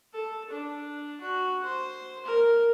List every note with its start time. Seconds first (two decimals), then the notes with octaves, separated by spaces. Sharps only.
0.14 A4
0.50 D4
1.21 F#4
1.63 C5
2.25 A#4